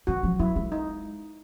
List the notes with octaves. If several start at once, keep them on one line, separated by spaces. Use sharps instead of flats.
D#3 F#4
F3
F#3 E4
G#3
D#4